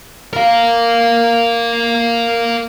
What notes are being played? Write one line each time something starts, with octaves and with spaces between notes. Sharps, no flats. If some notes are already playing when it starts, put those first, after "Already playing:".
A#4 F5